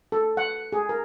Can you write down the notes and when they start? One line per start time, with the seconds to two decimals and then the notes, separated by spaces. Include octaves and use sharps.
0.12 A4
0.37 F#5
0.72 G#4
0.89 A#4